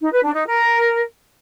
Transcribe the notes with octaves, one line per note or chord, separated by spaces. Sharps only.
D#4
B4
D4
D#4
A#4